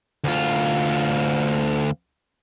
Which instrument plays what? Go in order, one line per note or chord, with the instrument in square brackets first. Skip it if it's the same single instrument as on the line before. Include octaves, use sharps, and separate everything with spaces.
[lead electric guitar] D2 F4